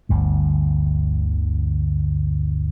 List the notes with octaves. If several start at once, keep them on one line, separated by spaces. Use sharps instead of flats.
G1 D2 G2